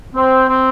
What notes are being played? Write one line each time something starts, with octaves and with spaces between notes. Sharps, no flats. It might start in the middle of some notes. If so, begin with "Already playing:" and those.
C4
C4